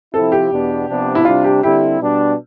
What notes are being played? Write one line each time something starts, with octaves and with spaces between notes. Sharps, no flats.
C3 F3 C4 E4 A4
G4
E2 B2 B3 D4
C3 F3 B3 D4
E4
C3 G3 D4 F4
G4
D3 G3 C4 E4 G4
B2 G3 D4